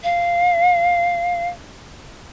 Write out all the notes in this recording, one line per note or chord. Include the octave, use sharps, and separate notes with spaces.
F5